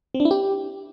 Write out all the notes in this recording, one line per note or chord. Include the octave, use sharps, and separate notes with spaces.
C4
D4
E4
G4